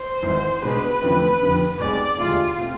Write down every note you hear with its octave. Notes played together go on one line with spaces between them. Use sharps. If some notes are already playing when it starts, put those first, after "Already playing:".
Already playing: C5
G#1 G#2 E3
B2 G#3 D4 G#4 B4
E2 D3 F3 A3 C4
F1 F2 D3 F3 B3
B1 B2 G#3 C4 G#4 D5
E1 D2 C3 E3 G#3 F4
B2 A3 C4 F4